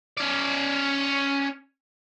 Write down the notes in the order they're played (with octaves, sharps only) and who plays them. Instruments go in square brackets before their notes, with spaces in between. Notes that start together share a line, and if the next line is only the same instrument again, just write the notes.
[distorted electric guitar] C#4 D5